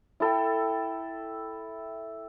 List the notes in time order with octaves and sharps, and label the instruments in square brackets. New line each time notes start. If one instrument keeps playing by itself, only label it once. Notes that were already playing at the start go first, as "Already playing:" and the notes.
[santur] E4 A4 G5